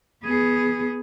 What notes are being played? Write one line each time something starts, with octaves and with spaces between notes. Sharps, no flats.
B3 G#4